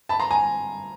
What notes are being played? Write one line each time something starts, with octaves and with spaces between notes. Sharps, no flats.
A5 B5
A#5 C6
G#5 A#5